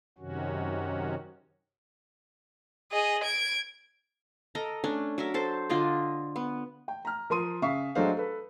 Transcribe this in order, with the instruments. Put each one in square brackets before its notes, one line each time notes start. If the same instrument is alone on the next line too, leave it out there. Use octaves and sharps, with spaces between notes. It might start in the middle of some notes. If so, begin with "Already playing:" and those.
[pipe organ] F#2 C3 D#3 C#4 F#4
[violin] G#4 D#5
G#6 D7
[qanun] A4 A#4 D#5 A#5
A3 C#4 D4
F#3 A#4 E5
A4 C5 A5
D3 F4 D5 D#5
B3
[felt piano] G5
A#5 F6
F3 A#4 C6 D#6 D#7
C#3 E5 F5 C#6 D#6 C7
F#3 G#3 A3 D4 C5 F5
A4 B4